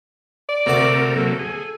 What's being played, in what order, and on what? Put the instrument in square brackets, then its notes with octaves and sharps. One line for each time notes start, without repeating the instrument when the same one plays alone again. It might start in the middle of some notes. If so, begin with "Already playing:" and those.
[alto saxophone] D5
[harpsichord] D2 F#4 D6 [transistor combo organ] C3 A3 A#4
[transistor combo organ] C3 F#3 A#3 [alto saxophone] A4
[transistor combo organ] G#4